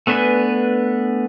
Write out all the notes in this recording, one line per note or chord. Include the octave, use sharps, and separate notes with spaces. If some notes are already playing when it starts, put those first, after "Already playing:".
A3 B3 D4 B4 G#5